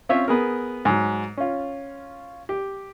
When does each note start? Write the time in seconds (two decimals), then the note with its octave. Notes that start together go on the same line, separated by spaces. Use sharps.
0.09 C4 C#4 F4 C#5 E5
0.28 B3 G#4 A#4
0.85 G#2 F#3
1.37 C#4 F4
2.49 G4